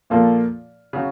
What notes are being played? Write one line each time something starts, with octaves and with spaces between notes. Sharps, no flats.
A#2 F3 A#3 F4 A4
C#3 F#3